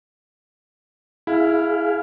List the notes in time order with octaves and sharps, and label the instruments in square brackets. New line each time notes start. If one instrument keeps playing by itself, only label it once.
[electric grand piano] E4 [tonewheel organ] G#4 F5